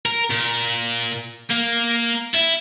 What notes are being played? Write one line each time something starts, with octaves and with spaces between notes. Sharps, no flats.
A#4
A#2
A#3
E4